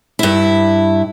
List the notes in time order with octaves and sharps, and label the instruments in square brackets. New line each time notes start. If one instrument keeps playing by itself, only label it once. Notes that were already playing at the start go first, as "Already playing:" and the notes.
[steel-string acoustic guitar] G2 E4